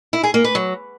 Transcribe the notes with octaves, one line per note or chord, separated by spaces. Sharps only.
E4
G#4
A#3
B4
F#3